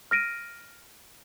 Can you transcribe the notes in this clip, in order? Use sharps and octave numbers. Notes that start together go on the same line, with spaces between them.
F6 A#6 D7 D#7